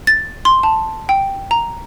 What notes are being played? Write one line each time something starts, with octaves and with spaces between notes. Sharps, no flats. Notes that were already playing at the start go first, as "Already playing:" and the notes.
A6
C6
A5
G5
A#5